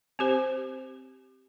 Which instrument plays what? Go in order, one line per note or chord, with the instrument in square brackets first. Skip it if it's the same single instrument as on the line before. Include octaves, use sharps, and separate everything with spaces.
[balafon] C4 G4 C5